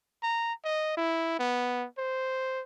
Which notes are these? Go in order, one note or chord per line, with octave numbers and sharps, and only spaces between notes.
A#5
D#5
E4
B3
C5